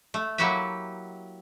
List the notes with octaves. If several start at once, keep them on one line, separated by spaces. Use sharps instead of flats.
A3
F#3 A#3 E4 F#4 G4 E5